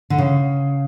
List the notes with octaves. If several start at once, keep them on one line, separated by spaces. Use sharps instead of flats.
D3
C#3